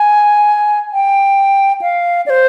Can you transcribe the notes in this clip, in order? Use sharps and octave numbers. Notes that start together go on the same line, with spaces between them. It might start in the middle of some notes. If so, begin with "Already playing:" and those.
Already playing: G#5
G5
F5
D5
C5